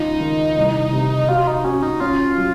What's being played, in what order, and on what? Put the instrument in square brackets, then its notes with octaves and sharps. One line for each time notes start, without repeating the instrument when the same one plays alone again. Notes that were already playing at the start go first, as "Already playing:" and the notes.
Already playing: [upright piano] C#2 F3 F4 [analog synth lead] D#4
[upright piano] D#3
C2
C3
[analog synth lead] F4 [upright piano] F#4
[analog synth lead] D#4
[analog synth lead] C#4 [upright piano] F#4
[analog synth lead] D#4
[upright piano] C#4 [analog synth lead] F4
[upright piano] F#3